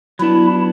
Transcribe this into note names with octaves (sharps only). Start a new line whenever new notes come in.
F#3 B3 D4 E4